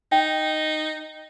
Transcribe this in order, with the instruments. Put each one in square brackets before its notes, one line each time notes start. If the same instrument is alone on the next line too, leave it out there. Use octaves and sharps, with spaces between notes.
[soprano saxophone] D#4 [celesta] G5